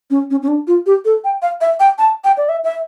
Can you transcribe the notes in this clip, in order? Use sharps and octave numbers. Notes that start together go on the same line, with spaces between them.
C#4
C#4
C#4
D4
F4
G4
A4
G5
F5
E5
G5
A5
G5
D5
E5
E5